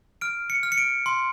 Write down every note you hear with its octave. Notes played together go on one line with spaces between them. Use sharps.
F6 D7
C#7
F6
C#7
D7
C6